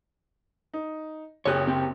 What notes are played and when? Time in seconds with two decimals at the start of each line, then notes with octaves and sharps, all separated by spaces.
0.74 D#4
1.45 F#1 G4 G#4 C#5 F#6
1.67 C4 G4